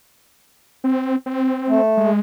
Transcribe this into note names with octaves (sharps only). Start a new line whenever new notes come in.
C4
C4
A3
G#3